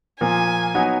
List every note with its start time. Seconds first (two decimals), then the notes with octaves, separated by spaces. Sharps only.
0.21 A#2 F3 A#3 G#5
0.75 F#3 B3 D#4